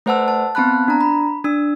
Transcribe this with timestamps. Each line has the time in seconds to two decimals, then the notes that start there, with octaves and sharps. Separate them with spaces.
0.06 A3 B4 C5 F#5 A5 E6
0.28 A5
0.55 B3 C4 A5 B5 F#6
0.88 D4 A#5
1.01 B5
1.44 D4 E6